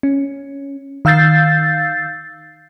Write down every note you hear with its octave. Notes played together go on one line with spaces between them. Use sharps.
C#4
D#3 F5 E6 G6 A6 C7